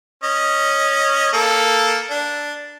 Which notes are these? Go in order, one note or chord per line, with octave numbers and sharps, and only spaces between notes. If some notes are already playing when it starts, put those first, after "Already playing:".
C#4 D#5
A#3 A4
D4